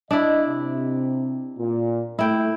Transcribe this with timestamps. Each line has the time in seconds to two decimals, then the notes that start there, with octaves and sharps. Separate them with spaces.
0.11 D4 E4 D#5
0.47 C3
1.58 A#2
2.19 A3 E4 G5